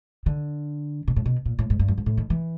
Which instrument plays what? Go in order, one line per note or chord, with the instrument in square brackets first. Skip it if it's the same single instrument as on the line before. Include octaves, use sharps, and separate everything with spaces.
[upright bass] D3
B2
A2
B2
A#2
A2
G#2
G2
F#2
G#2
A2
D#3
E3